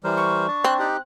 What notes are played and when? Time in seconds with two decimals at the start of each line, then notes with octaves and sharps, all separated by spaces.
0.04 E3 G3 A#4 C5
0.17 C#6
0.48 D4 A5
0.64 C4 F#6
0.79 D#4 G4 F#6